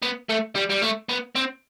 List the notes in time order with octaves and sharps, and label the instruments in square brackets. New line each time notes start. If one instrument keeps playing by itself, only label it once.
[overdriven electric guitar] B3
A3
G3
G3
A3
B3
C4